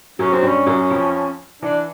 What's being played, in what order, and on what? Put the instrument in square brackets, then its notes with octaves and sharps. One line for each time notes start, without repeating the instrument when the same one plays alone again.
[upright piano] F#2 F#3 [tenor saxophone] C#4
[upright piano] F#3 [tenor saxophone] C4
[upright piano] G2 G3 [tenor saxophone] C#4
[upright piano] F#2 F#3
F2 F3
[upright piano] E3 [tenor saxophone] D4